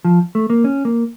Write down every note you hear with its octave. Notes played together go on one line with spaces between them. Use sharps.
F3
A3
A#3
C#4
A#3